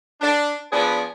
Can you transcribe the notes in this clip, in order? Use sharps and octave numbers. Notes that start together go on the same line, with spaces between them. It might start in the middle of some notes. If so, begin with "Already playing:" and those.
D4
F3 B3 D4 G#4 B4 D5